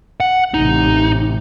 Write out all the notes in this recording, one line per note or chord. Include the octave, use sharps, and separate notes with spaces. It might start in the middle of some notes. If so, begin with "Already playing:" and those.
F#5
A1 C3 D#4